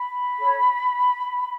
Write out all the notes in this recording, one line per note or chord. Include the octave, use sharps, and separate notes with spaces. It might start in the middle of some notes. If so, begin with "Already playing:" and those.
Already playing: B5
A4 C#5